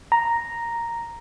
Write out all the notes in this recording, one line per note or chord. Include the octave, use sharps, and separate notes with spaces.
A#5